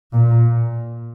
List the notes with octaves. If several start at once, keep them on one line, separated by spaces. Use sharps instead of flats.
A#2